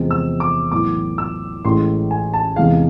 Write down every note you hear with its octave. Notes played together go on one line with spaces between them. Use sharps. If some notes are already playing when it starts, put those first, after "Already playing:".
Already playing: E2 C3 F3 G#3 C4
E6
D6
B1 A2 E3 D6
E6
A1 A2 E3 G#3 C6
G#5
A5
E2 C3 E3 G#3 F5